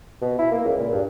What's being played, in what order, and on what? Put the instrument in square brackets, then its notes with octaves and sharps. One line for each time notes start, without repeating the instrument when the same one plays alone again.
[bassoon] B2
E4
A#3
C#2
A#2
G2